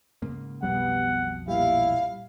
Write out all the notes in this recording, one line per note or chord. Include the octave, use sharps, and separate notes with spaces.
G#2 C#3 A#3
B1 F2 B2 G3 B3 F#5
A#2 G3 E4 F5